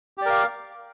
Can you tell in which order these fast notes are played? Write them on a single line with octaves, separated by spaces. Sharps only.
G4 D5 A#4 F5